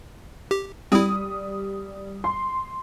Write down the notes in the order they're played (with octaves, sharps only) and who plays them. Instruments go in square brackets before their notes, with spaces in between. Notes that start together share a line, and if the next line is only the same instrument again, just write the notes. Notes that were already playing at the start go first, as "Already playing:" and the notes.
[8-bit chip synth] G4
[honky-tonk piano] G3 D#6 [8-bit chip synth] C4 E4
[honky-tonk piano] C6